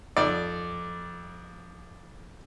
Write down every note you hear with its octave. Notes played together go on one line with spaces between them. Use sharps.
F2 D5